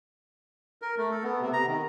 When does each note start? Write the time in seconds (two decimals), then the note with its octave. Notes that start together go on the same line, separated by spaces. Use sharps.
0.82 A#4
0.98 A3
1.11 A4
1.24 B3
1.41 C3
1.53 A#5
1.66 D#3